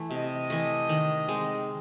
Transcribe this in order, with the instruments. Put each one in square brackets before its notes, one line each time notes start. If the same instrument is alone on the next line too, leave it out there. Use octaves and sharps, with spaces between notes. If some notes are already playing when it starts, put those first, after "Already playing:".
Already playing: [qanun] E3 A3
[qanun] C3 [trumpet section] D#5
[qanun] E3 A3
D#3
G#3 C4